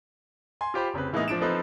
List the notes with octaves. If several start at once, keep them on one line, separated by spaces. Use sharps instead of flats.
G#5 C6
F4 G4 C5 B5
F1 C#3 C4 B4
A2 E3 G#3 A#3 B3 D#4
F3 D4 D7 E7
F3 C4 D#4 A4 B4 C5